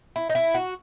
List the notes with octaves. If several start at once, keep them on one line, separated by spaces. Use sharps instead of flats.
E4
D#4
E4
F#4